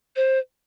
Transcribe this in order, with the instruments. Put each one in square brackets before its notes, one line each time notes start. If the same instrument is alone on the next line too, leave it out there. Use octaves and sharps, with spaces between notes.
[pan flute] C5